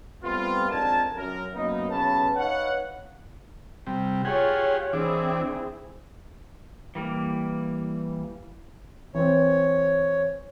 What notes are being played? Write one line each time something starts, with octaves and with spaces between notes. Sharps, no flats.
G3 A3 B3 C4 F4
F2 G#2 D4 A#4 G#5 A5
F#2 A#4
F#2 F#3 A#3 B3 D#4
B1 C#3 C#4 B4 A5
D#4 B4 C#5 F5 F#5
C3 G3
F4 G4 G#4 C#5 F5 F#5
E3 C4 D4 E4 G#4
E3 G3 A#3
E3 C4 C#5